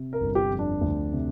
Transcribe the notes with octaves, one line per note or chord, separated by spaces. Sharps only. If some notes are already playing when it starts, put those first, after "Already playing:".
Already playing: C3
A#4
G1
G4
F2
D4
D2
C3